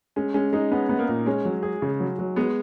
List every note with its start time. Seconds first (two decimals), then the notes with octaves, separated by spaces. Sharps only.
0.16 G#3 C#4
0.34 G#3 C#4
0.53 G#3 D#4
0.71 B3 C#4
0.89 B3
0.99 A#3
1.09 A#2
1.26 G#3 C#4
1.45 F#3
1.63 G#4
1.82 C#3
2.00 F#3
2.19 F#3
2.36 G#3 B3